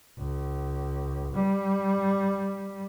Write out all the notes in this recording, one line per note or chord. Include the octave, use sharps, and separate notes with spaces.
C#2
G3